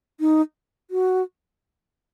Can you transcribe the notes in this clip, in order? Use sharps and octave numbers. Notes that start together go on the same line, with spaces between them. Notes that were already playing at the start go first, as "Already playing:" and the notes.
D#4
F#4